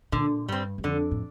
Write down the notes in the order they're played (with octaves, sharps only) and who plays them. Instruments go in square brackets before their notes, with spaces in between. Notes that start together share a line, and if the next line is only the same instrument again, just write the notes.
[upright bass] A#2 [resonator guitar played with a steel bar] D3
[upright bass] G2 [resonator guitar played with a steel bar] G3 C4
[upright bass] G2
[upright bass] F2 [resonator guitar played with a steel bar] D3
[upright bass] A2